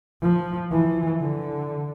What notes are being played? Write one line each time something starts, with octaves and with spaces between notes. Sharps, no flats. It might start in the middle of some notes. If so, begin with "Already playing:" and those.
F3
E3
D3